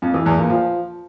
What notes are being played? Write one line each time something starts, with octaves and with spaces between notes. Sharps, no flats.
F2
E3
E2
A#2
F3